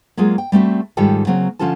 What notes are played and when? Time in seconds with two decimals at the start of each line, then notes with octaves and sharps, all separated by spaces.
0.17 F#3 G#3 A#3 F4 G#4
0.38 G5
0.52 G3 A3 C4 F#4
0.97 G#2 D#3 G3 F4 A4 G5
1.27 C#3 F#3 A#3 C4
1.59 D3 F3 C#4 F4 A4 A5